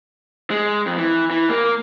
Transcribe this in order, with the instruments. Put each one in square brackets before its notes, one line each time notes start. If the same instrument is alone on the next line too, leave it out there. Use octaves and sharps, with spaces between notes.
[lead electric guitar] G#3
F2
E3
E3
A#3